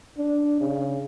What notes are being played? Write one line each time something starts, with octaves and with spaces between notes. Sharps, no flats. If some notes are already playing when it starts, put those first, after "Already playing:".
D4
C#3